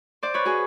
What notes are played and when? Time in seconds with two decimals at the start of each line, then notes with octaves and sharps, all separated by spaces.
0.23 C5 D5
0.34 B4 C#5
0.45 F#4 G#4